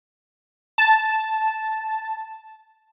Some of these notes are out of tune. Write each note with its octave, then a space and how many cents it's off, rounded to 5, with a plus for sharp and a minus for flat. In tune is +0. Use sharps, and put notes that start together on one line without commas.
A5 -5